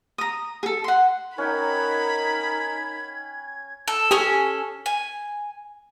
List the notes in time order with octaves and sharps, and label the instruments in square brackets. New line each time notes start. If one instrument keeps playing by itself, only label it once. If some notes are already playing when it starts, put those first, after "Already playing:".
[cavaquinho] A#5 D#6
G#4 A4
F#5 C6
[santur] C#4 F#5 G5 [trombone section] D#4 A#4 [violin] B5 [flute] G#6
[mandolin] A4
[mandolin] C#4 A4 G#5 [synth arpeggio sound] G4 D#6
[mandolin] G#5